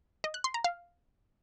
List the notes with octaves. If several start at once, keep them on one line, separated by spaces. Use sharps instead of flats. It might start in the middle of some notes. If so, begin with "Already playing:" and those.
D#5
F#6
C6
A#5
F5